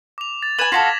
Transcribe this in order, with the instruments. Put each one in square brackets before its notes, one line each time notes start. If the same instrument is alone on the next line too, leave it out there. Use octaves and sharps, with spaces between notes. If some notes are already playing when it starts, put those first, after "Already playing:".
[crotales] D6 F7
A6
[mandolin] B4 G#5 [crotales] G#6 E7 F#7
[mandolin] F4 F#4 A4 [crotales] A#6 B6